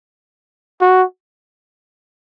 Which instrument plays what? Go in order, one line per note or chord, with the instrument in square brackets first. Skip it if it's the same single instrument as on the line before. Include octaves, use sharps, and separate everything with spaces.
[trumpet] F#4